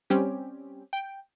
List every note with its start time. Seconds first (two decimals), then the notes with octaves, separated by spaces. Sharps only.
0.10 G3 C4 C#4 G4
0.93 G5